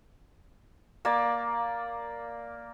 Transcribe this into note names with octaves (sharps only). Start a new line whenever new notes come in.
A#3 D5